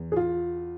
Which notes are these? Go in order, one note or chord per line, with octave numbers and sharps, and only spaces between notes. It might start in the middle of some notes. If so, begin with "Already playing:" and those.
Already playing: E2
G#4
F4